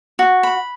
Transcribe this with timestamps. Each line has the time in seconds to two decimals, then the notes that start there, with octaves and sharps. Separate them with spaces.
0.19 F#4
0.43 B5